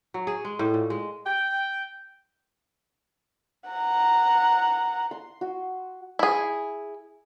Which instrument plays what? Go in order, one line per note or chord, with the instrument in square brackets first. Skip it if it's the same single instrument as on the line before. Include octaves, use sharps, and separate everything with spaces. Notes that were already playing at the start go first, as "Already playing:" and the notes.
[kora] F#3
G#4
G#3
A2
A#2
G#3
[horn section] G5
[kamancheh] F#5 A#5
[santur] C6
F#4
[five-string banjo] E4 G#4